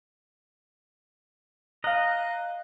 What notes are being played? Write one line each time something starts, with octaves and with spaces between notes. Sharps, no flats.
D#5 F5 A#5 F#6